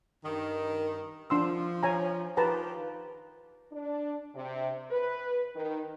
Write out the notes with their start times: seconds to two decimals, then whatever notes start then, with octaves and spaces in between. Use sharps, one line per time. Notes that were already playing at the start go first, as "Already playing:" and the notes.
0.22 G2 D#3
1.30 F3 D4 C6 E6
1.83 C#5 G#5 A#5
2.37 D#3 F3 G4 B4 A5 A#5
3.72 D4
4.35 C3
4.91 B4
5.56 D#3